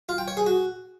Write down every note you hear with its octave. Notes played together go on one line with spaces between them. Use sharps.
F4
G5
C#5
G#4
F#4